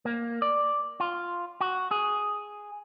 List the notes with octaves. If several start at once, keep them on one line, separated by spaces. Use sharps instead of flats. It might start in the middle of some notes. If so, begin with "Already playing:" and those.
A#3
D5
F4
F#4
G#4